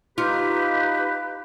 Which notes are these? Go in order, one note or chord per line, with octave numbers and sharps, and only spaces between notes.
D#4 F4 G4 B4